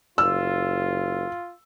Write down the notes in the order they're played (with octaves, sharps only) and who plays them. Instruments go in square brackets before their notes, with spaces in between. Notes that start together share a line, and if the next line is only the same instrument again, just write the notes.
[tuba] F#1 [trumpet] F4 [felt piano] E6